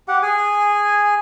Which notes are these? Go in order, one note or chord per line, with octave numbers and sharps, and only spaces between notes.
G4 F#5
G#4 G#5